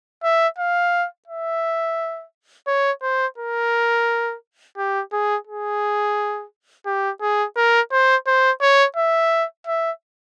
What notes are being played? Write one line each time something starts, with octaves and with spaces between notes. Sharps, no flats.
E5
F5
E5
C#5
C5
A#4
G4
G#4
G#4
G4
G#4
A#4
C5
C5
C#5
E5
E5